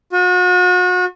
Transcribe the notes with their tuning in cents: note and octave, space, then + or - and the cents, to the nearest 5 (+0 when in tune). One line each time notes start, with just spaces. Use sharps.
F#4 -40